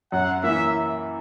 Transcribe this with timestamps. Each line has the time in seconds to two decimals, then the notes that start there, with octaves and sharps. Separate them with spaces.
0.12 F#2 F#5
0.43 E3 A#3 E5